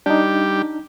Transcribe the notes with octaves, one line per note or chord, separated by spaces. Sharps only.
G3 D4 D#4 G4